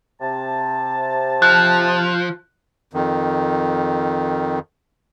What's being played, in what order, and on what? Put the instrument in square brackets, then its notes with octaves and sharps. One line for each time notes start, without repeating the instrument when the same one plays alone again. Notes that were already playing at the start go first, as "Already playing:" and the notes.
[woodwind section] C3 A5
[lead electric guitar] F3 [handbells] F#6
[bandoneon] F2 D#3